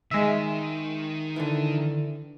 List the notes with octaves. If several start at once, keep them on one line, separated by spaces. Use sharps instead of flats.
D#3 G#3 E5
D3 E3